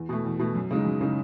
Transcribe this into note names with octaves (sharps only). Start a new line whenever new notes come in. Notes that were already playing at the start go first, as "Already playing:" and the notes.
Already playing: E2
B2 A3
E2
B2 A3
F#2
C#3 G#3 D#4
F#2
C#3 G#3 D#4